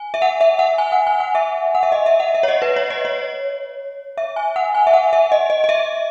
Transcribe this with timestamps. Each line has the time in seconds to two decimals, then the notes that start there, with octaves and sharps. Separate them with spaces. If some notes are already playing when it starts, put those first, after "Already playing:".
Already playing: G#5
0.14 E5
0.22 F#5
0.41 E5
0.59 F#5
0.78 G#5
0.92 F#5
1.07 G#5
1.20 F#5
1.35 E5
1.75 F#5
1.83 E5
1.92 D#5
2.06 E5
2.20 F#5
2.34 E5
2.43 C#5
2.48 D#5
2.62 B4
2.76 C#5
2.90 D#5
3.05 C#5
4.17 E5
4.36 G#5
4.56 F#5
4.75 G#5
4.87 E5
4.93 F#5
5.13 E5
5.32 D#5
5.50 D#5
5.64 D#5
5.69 E5